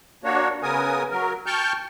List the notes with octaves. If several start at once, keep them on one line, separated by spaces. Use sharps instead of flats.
A#3 D4 F#4 C#5
C#3 B3 A#4 G#5 D#6
F#3 A#4
G5 A5 C#6 F6 G6